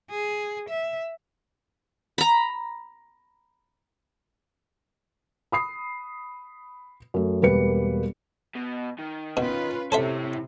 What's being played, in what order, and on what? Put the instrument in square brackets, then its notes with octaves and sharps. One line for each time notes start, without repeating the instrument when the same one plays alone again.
[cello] G#4
E5
[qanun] A#5 B5
[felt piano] B5 D#6 C7
F#2 A3
E1 G3 A#3 B4 C#7
[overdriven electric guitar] B2
D#3
[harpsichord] B2 [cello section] C#4 F4 B4
[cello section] C3 [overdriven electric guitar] E4 C#5 [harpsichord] A4 C5 E5